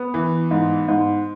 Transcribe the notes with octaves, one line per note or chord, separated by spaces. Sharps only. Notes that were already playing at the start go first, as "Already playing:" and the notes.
Already playing: B3
E3
G#2
G#2